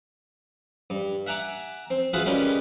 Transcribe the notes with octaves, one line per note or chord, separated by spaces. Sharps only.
G2
E5 F#5 G#5 A#5 D6
C4
F4 F#4 G#4 B4 E5 F#5
G3 G#3 C#4 G4 A#4 B4